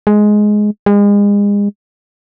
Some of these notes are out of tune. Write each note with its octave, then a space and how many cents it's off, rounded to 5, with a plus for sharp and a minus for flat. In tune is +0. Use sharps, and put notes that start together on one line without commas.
G#3 +10
G#3 -35